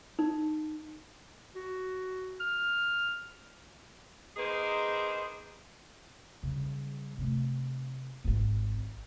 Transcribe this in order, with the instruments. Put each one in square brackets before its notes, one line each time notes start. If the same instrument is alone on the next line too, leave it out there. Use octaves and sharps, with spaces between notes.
[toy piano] D#4
[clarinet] F#4
F6
[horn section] A#3 D#4 G#4 B4 C5
[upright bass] C#3 G3
C3 A3
D#1 G#1